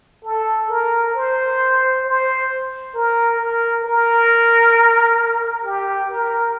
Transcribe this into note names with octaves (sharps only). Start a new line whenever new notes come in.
A4
A#4
C5
C5
A#4
A#4
A#4
G4
A#4